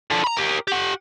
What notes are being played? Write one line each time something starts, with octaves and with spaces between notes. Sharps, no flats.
D3 F3
A#5 B5
G4 A#4
G4 F#5